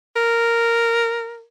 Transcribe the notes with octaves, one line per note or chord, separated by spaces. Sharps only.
A#4